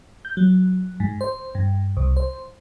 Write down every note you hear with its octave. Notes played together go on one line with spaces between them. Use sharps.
G6
F#3
G#2
C5
G2
C2
C5